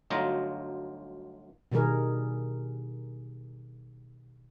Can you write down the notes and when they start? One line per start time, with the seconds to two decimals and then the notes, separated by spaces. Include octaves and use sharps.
0.10 G1 D2 F#3 D#4 F4 A#5
1.72 B2 D#3 G3 G#4 A#4